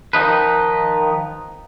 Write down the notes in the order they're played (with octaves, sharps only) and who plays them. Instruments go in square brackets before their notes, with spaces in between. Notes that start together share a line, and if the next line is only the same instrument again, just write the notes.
[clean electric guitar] D#3 F3 D#4 B4